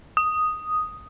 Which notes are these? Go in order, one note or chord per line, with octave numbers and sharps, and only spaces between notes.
D#6